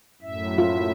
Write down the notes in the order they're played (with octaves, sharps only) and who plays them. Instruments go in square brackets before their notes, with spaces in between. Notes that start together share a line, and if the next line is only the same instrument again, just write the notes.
[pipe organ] F#2 A2 E5
[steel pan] F4